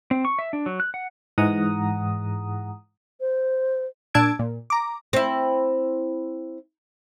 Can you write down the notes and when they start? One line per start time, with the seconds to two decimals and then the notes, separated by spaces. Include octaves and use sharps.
0.11 C4
0.25 C#6
0.39 E5
0.53 D4
0.66 F#3
0.80 F#6
0.94 F#5
1.38 G#2 E3 G#3 F#5 A#5 D#6
3.20 C5
4.14 A#2 D4 A5 E6 G#6 D7
4.39 A#2
4.70 A#5 D6
5.13 C4 E4